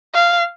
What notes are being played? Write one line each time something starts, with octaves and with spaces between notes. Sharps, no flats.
F5